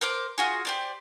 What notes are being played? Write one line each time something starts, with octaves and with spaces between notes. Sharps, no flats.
A#4 C5 D6
F4 F#4 G#4
G4 C5 D5